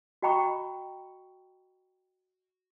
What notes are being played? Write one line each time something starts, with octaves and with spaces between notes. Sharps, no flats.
F#4 D#5 G5 A#5 B5 C#6